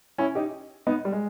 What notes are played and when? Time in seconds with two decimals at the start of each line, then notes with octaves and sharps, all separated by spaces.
0.18 C#4 E4
0.35 D#4 G4
0.87 B3 D#4
1.05 G3
1.12 G#3